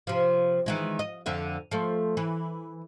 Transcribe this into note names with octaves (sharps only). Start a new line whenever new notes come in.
C3 F3
D#3 E3 G#3
D#5
F2 D3 E5
F3 A3
E3